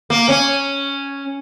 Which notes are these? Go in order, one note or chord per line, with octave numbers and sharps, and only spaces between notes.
A#3
C#4